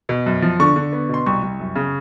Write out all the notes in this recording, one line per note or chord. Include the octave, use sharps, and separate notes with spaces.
B2
F#2
F3
D3 C#6
D3
B3
B2 C6
C2 C#6
C2
F#2
C#3